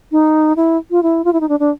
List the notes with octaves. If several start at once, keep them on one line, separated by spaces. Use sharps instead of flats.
D#4
E4
F4
E4
F4
E4
D#4
D4
D4